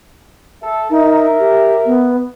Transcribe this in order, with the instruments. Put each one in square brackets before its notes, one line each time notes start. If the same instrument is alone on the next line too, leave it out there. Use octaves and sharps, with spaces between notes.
[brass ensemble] A4 E5
[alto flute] D#4 [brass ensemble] A#4 E5
[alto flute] G4
B3